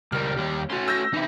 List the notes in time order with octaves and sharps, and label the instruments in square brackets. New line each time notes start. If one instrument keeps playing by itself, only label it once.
[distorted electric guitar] C#2 A#4 [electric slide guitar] G3 [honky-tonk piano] F6
[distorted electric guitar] D#2 G4
[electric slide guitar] A3 C#4 [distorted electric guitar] F#4 C6
[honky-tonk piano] E6 G6 A#6
[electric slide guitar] C3 E3 [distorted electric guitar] D#4 E4